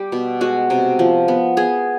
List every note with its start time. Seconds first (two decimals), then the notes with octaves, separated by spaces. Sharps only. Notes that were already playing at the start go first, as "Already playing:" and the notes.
Already playing: G3 G4
0.12 B2
0.41 G#3 F#4
0.70 C3
0.99 F3
1.28 B3
1.57 B3 G#4